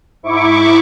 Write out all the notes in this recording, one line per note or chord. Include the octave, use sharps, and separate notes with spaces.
G#2 E4 C#6 D6